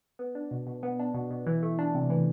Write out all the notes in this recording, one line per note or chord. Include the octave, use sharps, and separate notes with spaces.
B3
D4
B2
B2
B3
D4
B2
B2
E3
A3
D4
C3
E3